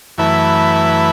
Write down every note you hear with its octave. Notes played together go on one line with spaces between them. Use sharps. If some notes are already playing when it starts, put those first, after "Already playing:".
F#2 E3 A3 E4 B4